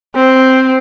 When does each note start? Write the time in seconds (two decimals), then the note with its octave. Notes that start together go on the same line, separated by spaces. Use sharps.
0.16 C4